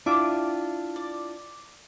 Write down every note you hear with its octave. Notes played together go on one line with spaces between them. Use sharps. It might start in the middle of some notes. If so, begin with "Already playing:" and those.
D4 E4 F4 G4 E5 D6
D5